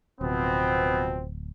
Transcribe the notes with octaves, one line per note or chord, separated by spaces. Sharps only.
D1 B2 F3 B3 C4